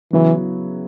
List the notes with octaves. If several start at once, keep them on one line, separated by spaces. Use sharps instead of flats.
C#3 E3 F#3 B3 E4